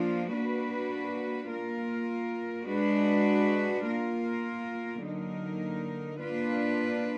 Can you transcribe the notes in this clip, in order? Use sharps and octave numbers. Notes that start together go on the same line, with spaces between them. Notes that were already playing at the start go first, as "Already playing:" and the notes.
Already playing: F3 A#3 D4 F4
A#3 D4 F#4 B4
A#3 F4 A#4
G#3 D4 F#4 B4
A#3 F4 A#4
D3 F#3 A#3 D#4 A#4
A#3 D4 F4 B4